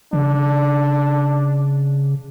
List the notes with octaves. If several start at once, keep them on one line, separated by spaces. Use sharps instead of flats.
C#3 D4